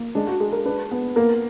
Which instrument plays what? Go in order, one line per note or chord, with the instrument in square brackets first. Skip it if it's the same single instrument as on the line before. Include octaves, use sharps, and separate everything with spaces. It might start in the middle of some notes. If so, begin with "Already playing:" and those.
Already playing: [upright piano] A#3
[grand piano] G#3 [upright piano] D4
[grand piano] F#4
[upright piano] G#3 [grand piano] G#4
[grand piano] A#4
[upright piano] D4 [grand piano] B4
[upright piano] B3
[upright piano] A#3 [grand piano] A#4